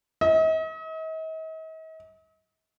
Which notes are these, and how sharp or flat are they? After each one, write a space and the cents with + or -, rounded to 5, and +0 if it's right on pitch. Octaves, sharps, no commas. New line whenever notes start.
D#5 +45